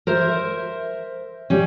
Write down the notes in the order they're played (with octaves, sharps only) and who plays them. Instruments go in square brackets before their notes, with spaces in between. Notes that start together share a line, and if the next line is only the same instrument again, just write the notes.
[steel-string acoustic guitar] A#4 C5 E5
G3 C#4